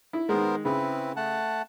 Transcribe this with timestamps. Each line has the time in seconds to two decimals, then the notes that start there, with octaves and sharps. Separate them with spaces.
0.13 E4
0.29 D#3 G#3 B3 A#4 C5
0.65 C#3 C4 E4 B4
1.16 A3 F#5 A5